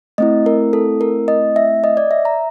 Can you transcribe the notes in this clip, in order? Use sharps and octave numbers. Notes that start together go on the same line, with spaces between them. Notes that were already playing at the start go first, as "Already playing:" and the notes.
A3 C4 E4 D#5
A#4
A4
A#4
D#5
E5
D#5
D5
E5
A#5